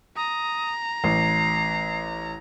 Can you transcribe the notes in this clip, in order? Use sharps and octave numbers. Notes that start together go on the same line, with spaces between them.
A#5 D#6
A1 C7